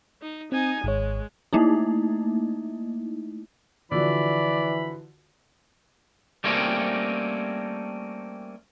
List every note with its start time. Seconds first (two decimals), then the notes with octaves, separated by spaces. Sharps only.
0.22 D#4
0.52 C4 D#4 G#5
0.84 G#1 G#3 C#5
1.53 A3 A#3 D#4 E4
3.92 D3 E3 F3 F#4 D5 B5
6.44 G3 A3 A#3 C4 C#4